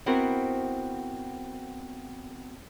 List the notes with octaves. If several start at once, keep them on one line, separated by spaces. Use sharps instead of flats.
B3 C4 E4 F#4 A#4 C5